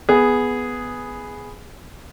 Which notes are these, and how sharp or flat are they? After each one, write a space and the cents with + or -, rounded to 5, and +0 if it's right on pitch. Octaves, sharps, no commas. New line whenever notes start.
B3 +0 G#4 +0